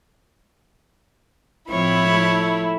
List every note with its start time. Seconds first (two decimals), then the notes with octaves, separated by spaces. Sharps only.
1.70 A2 F3 C4 E4 C#5
2.09 A3